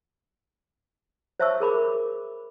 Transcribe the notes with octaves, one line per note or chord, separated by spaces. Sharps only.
C5 C#5 E5 A5 C#6 E6
G#4 A#4 B5 D6